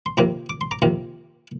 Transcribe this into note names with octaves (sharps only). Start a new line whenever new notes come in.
C6
F2 C3 D#3 A#3 A#5 D6
D6
C6
A#5 D6
F2 C3 D#3 A#3